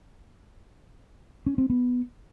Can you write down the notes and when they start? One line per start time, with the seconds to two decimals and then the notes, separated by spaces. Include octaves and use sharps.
1.46 C#4
1.58 C4
1.70 B3